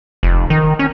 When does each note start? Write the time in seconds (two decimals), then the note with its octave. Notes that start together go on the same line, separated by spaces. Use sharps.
0.23 F1
0.50 D#3
0.79 C#4